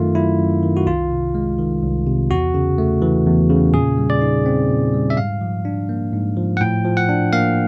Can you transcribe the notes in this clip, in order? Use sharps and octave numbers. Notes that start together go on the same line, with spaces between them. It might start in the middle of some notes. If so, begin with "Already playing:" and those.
Already playing: F#2 D#3 A3 F4
F#3 E4
F#2
D#3
F#4
C2 F4
C3
G#3
D#3
C2
C3
E2 F#4
C#3
A3
E3
E2
C#3
A#2 G#4
G3
D5
D#4
C4
A#2
G3
E5
G#2 F5
F3
D4
A#3
G#2
F3
F#5
A2 G5
F3
F#5
D4
A#3 F5